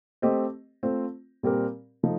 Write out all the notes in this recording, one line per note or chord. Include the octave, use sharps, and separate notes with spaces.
A3 C4 G4 C5 D#5
A3 C4 F4 C5
A#2 G3 C4 G4 A#4
F3 A3 D#4